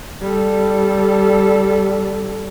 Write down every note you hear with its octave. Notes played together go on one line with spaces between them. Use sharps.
G3 A4